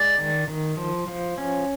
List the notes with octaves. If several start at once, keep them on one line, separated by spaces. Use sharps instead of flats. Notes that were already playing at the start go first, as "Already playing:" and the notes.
Already playing: G#3 D5
D#3
D#3
F3
F3
C#4